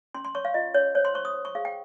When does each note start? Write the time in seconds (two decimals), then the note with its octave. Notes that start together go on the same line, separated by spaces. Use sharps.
0.15 C#4 C6
0.25 C6
0.35 C#5 C#6
0.45 F5
0.54 F4 D#5
0.75 C#4 C#5
0.95 C5 C#5
1.05 C6
1.14 C5 C#6
1.25 D#6
1.34 C5
1.45 C#6
1.55 G#4 F5
1.65 G5